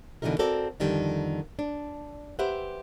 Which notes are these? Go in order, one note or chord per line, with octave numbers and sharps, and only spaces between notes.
B2 D3 E3 G#3 D#4 A#4
C4 F#4 A4 A#4 D5
F2 D3 D#3 G3
D4
G4 B4 C5 E5 F#5